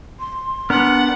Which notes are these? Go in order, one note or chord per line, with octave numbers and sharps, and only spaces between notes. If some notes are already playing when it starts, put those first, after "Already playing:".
C6
B3 D4 A#4 F#5